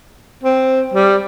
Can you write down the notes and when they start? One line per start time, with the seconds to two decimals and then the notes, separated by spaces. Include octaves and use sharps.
0.44 C4
0.94 G3